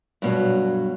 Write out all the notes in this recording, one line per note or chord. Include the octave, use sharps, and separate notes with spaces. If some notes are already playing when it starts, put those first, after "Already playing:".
G2 B2 F#3